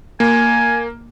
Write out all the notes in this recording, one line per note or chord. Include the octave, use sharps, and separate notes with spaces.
A#3 G#5